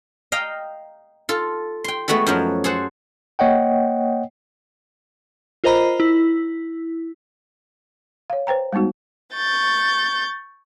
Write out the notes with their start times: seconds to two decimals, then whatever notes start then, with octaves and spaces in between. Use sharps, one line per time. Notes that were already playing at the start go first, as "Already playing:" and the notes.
0.32 D#5 F5 G5 A#5
1.29 F4 A4
1.84 G5 C6
2.08 G#3 A3 B3 F#4 A4
2.27 F#2 F3 F#3
2.64 G#4 A4 C5 F#5
3.39 A#3 C#5 D#5 F#5 G5
5.64 F4 A#4 C5 D#5 A#5 B5
6.00 E4
8.30 C#5 F5
8.47 B4 C5 G5 A#5
8.73 G3 G#3 B3 D#4 F#4
9.33 C#6 G6 A6